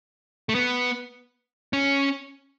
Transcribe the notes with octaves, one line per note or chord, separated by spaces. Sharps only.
A3
B3
C#4